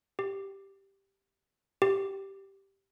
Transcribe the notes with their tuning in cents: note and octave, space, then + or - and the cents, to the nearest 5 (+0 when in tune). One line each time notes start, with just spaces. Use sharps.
G4 +0
G4 -5